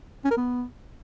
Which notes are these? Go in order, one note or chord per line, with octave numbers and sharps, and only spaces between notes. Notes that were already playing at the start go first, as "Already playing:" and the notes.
C#4
A#4
B3